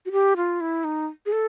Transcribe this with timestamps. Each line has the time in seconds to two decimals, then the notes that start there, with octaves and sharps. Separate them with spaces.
0.06 F#4
0.12 G4
0.37 F4
0.61 E4
0.84 D#4
1.26 G#4
1.32 A4